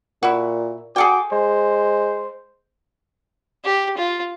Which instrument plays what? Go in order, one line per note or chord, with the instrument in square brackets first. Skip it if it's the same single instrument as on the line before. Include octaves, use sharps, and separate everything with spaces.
[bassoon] A#2 [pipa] E4 F#4
[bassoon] F#4 [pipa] G#4 A4 G5 [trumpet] D6
[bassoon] G#3 [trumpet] C5
[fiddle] G4
F4